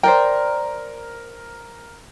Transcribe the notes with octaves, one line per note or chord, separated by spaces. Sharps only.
A#4 C5 D5 G5